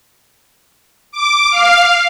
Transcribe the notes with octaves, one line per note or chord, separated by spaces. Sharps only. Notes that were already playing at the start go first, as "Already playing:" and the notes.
D6
F5